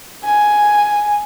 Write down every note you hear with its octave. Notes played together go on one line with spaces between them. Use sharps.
G#5